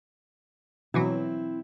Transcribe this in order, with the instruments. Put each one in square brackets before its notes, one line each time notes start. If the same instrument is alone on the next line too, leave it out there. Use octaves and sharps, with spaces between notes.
[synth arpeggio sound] B2 E3 F#3 [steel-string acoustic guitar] C4 E4